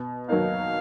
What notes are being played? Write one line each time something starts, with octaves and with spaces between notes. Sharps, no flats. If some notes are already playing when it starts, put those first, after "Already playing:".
Already playing: B2
F#3 A#3 D#4 F5